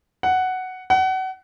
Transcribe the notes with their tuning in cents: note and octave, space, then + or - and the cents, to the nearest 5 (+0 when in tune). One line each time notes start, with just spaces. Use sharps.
F#5 +5
F#5 +30